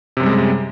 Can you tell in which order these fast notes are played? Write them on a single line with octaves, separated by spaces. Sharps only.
C3 F#2 G3 G#3